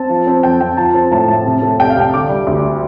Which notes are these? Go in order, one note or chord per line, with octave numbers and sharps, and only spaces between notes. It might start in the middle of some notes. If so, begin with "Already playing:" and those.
Already playing: C4 A5
F3
C4
F2 G5
F2 G5
F3 A5
C4
A2 A5
A2
C3
A3
C2 G5
F5
C2 G5
D3 D6
G3
D2